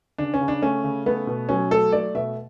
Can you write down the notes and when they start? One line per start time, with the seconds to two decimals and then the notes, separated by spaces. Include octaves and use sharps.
0.18 C#3 D4
0.34 C#4
0.41 C#3
0.48 D4
0.62 A3 C#4
0.84 C#3
1.06 A3 B3
1.27 B2
1.49 F#3 C#4
1.71 A3 A4
1.92 A3 D5
2.14 B2 E5